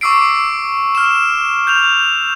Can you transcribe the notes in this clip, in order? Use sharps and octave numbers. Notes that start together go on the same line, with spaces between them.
C#6 D6 E6 C7 D7
F6 E7
G6 F7